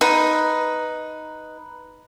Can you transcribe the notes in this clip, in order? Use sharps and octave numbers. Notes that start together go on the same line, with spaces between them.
D#4 B4